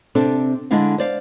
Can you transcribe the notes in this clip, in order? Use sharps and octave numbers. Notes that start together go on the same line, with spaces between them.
C3 C4 D4 A4
D3 G#3 D4 E4 F5
C5 D5 F5